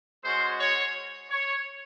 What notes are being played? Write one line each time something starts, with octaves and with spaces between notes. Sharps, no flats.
G#3 C#4 F#4 C5
C#5
C#5